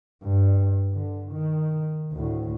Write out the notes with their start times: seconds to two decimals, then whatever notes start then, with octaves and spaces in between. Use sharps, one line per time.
0.24 G2
0.92 D3
1.32 D#3
2.12 D2 A2